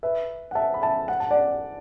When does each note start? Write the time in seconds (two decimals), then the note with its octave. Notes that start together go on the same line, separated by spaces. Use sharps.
0.03 B4 E5
0.51 F#5
0.55 E5 A5
0.74 B5
0.82 E5 A5
1.08 F#5
1.20 A5
1.31 D5 F#5